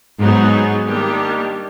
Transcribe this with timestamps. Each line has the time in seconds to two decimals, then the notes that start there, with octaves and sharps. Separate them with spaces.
0.19 G#2 F#3 B3 D#4 G#4
0.86 D#3 G3 A#3 D4 G4